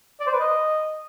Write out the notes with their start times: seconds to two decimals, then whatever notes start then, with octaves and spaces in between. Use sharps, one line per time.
0.20 D5
0.27 C5
0.33 B4
0.40 D#5